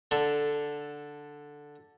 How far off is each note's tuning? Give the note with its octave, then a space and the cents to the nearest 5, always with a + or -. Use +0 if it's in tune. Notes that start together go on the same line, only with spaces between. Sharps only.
D3 +0 A4 +0